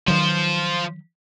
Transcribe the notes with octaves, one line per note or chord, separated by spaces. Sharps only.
D#3 F3 F#3 C5